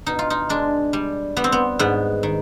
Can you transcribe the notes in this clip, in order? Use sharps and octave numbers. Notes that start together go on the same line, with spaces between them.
B2 D#4
F4
D#4
G#3 D4
G3
G3 B3
C4
B3
G#2 B3
D#3